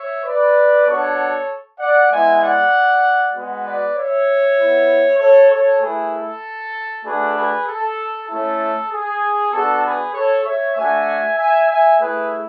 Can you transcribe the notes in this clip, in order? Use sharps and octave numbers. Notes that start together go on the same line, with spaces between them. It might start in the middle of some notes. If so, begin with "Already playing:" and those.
Already playing: C#5 E5
B4 D5
B3 D4 F#4 A4 C#5
D5 F#5
G#3 B3 E4 E5 G#5
D5 F#5
G#3 B3 F#4
B4 D5
C#5 E5
B3 E4
A4 C#5
A4 C#5
A3 E4 G#4 B4
A4
A3 D4 F#4 G#4 B4
G#4 B4
A4
A3 C#4 E4 A4
G#4
B3 D4 F#4 A4
G#4 B4
A4 C#5
C#5 E5
A3 D4 F#4 E5 G#5
E5 G#5
E5 G#5
A3 E4 G#4 B4